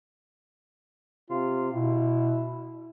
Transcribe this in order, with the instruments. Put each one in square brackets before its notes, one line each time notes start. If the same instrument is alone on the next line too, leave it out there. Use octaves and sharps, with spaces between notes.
[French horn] C3 [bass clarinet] F4
[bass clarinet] B2 [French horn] E4